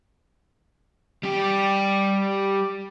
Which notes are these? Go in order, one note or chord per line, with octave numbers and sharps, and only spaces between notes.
G3 G4